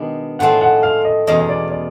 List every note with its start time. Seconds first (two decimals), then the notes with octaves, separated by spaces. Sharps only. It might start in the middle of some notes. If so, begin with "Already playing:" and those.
Already playing: B2 D#3 G#3 B3 D4
0.39 A2 F3 G#3 C4 F#5
0.61 F#5
0.83 F5
1.05 D#5
1.27 E2 B2 G#3 C#4 D#5
1.40 D#5
1.49 D5
1.70 D5